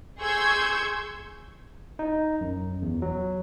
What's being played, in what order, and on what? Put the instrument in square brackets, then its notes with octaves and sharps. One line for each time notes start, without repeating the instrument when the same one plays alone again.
[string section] G#4 C6 C#6 E6 G6 G#6
[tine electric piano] D#4
F#2
E2
F#3